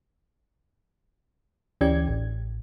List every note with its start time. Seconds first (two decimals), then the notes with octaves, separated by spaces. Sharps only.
1.81 D2 E3 C#4 G4 D5 G#6
2.08 A1